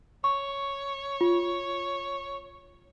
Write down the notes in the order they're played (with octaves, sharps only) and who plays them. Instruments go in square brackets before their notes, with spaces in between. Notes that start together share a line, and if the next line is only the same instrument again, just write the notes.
[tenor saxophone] C#5 [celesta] C#6
[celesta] F4